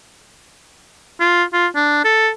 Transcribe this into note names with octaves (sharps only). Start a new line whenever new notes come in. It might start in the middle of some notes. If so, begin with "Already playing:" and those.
F4
F4
D4
A4